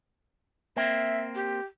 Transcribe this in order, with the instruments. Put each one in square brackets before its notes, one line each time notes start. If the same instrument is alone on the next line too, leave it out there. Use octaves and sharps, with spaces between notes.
[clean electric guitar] A#3 C4 [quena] E5
[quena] G4